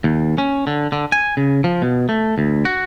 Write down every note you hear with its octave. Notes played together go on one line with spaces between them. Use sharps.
D#2
C#4
D3
D3
G#5
C#3
F3
B2
A3
D2
F#4